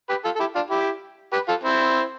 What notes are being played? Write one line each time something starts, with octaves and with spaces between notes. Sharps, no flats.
G4 B4
F4 A4
A4
E4 G4
D4 F4
E4 G4
G4 B4
F4 A4
C4 E4